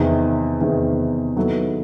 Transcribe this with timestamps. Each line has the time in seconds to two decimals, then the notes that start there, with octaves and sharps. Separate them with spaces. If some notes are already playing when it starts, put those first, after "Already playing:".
Already playing: E2 C3 D#3
0.61 E2 C3 D#3
1.37 D#3 F#3 B3 E4 A4